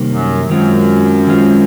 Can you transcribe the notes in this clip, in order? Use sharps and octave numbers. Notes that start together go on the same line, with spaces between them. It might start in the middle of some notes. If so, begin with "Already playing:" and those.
Already playing: C3 D#3 G3 A#3
F#2
F#2 D#3 G#3 C4 F4
D#3 G#3 C4 F4